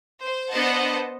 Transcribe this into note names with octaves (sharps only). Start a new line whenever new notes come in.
C5
B3 D4 C5 D#5 F#5 A5